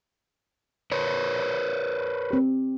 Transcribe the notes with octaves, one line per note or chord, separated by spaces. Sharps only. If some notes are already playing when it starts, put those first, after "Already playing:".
A#4 B4 C#5
C4 G4